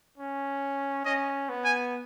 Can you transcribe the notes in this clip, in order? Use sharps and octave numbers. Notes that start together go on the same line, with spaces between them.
C#4
C#4 D#5
B3
G#5